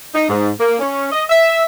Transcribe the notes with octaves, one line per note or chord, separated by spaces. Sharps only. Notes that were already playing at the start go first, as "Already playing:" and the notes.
D#4
G#2
A#3
C#4
D#5
E5